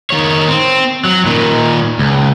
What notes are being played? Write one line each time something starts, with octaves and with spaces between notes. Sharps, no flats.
D#3 C#5
C4
F#3
A#2 D#3
C#2